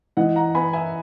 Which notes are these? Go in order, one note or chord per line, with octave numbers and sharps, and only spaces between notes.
E3 D#5 F#5
F#5 A#5
B3 G#5 B5
E5 G#5